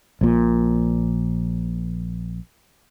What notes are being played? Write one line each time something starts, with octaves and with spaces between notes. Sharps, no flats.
A#1 A#2